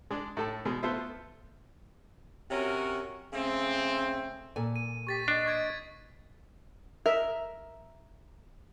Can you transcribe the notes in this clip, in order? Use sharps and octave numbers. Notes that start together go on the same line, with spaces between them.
G#3 D4
A2 A4 A5
B2 G#3
A3 B3 F4 A4 C5 E5
C3 C#4 F#4 A#4
C#3 A3 C4
A#2 A4 G#5
D#7
G4 C#6 A6 B6
D4 D#5
C#6 G#6 D7
A#4 D#5 E5